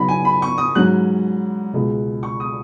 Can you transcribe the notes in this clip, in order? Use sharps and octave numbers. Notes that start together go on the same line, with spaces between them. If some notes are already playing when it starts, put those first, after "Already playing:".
Already playing: C#3 F#3 B3 D#4 B5
G#5
B5
C#6
D#6
G#2 F#3 C#4 F#6
C#2 B2 G#3
C#6
D#6